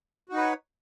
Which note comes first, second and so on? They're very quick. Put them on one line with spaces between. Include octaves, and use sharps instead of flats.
F#4 D#4 B4 C#5